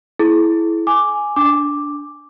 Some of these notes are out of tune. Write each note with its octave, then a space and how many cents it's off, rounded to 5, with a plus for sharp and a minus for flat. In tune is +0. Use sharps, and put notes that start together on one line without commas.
E4 +0 G#4 +45
G#5 +0 D6 +0
D4 -10 D6 +0